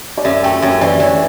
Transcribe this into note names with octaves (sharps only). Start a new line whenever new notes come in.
D5
F#2 E5
A3 G5
F#2 E5
E3 D5
E3 C#5